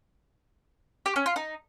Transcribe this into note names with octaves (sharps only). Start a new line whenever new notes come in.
G4
C#4
F4
D#4